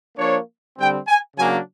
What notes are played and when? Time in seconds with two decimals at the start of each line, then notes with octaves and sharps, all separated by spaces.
0.18 F3 A#3 D4 C#5
0.78 D3 G3 C4 G5
1.08 G#5
1.37 C#3 F#3 A#3 D4 G#5